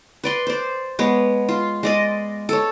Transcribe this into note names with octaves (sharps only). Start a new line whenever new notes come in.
B4 D5 C6
C5 D5
G#3 B3 C#5
F4
G#3 D5 D#5
A4 C#5